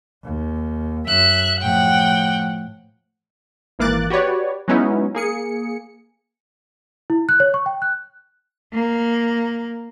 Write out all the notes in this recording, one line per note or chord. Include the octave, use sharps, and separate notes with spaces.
D#2
F#2 E5 F#6
A2 F3 F#5 G5
G#1 E3 A#3 D6 F#6 A6
F#4 G4 B4 C#5 D5
F#3 G#3 B3 C#4 D#4 E4
A#3 G#4 C#7
E4
F#6
C#5
C#6
G5
F#6
A#3